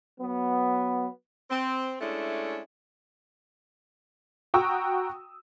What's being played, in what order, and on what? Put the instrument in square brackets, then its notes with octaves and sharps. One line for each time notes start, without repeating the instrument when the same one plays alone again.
[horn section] F#3 B3
[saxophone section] C4
G#3 A3 C#4 D4 E4
[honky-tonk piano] F#4 G5 A#5 C#6 D#6 E6